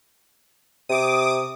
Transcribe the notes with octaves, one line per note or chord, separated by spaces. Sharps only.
C3 D6 D#6